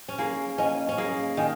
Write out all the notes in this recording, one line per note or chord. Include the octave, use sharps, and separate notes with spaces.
C#4
A#3 G#4
C#4 D#5 G#5
C#4
A#3 G#4
D#3 D#5 G#5